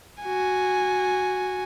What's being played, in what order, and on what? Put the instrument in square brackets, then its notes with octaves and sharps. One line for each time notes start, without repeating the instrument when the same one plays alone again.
[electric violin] F#4 G#5